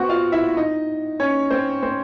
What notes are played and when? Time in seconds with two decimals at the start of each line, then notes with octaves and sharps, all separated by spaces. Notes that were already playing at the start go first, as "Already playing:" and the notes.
Already playing: B3 C4 F#4 F#5
0.09 F4 F5
0.32 E4 E5
0.57 D#4 D#5
1.20 C#4 C#5
1.50 C4 C5
1.83 C4 C5